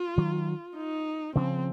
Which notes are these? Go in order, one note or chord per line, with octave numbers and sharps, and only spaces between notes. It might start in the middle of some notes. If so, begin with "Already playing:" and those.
Already playing: F4
D#3 F#3
D#4
C#3 F3 C4